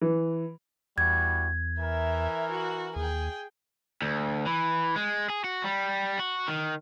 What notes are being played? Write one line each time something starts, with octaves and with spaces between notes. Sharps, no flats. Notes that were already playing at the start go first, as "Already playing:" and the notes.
E3
E2 E3 G3 F#4 G#6
E3 A#4 E5
F#4
D#2 G#4 G5
D2
E3
G#3
G#4
F#4
G3
F#4
D#3